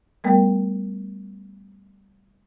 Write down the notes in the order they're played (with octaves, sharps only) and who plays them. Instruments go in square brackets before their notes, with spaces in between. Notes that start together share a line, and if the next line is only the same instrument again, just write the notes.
[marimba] G3 A3 B3 A#4 G5